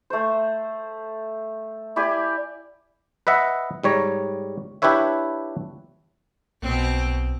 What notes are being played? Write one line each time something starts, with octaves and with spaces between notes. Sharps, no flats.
A3 C5
E4 G4 D5 G#5
B4 D#5 E5 F#5
G#2 G3 C#5 A#5
D4 E4 G4 B4 C#5 E5
B1 B2 C4